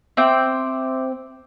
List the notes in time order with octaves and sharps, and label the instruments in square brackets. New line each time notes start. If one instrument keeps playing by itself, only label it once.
[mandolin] C4 G5 [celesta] E5 D6